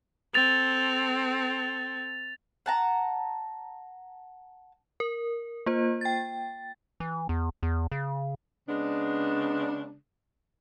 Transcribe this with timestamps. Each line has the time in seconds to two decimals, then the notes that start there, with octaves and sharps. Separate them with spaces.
0.34 C4 A4 A6 F7
2.66 F#5 A5 A#5
5.00 A#4
5.66 A#3 F4 C5
6.01 G5 A6
7.00 E3
7.29 E2
7.63 E2
7.92 C#3
8.68 C#3 G#3 B3 D4